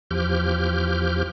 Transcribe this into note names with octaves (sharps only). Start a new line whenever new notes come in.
E2 F3 G4 F6 G6